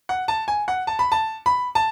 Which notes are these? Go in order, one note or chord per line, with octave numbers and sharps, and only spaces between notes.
F#5
A5
G#5
F#5
A5
B5
A5
B5
A5